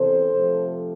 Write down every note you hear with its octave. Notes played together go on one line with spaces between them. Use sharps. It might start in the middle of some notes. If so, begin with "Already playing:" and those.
Already playing: E2 C3 E3 A4 C5
C3 F3 A3